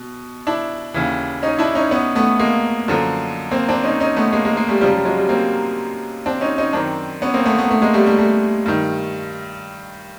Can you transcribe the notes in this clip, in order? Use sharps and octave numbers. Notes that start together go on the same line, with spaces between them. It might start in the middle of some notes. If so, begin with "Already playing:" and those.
Already playing: B2
D4 E4
D#2 C#3 E3
C#4 D#4
D4 E4
C#4 D#4
B3 C#4
A3 B3
G#3 A#3
F#2 D3 F3
A#3 C4
C4 D4
C#4 D#4
C#4 D#4
A3 B3
G#3 A#3
G#3 A#3
G#3 A#3
G3 A3
F#2 C#3 F3 G3
G3
F#3 G#3
G3
A#3 C4
C4 D4
C#4 D#4
C#4 D#4
F#2 D#3 C4 D4
B3 C#4
A#3 C4
A3 B3
A3 B3
A3 B3
G#3 A#3
G3 A3
G3 A3
G3 A3
G2 D#3